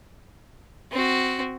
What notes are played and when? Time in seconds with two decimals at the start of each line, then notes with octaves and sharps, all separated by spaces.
0.92 C4 F#4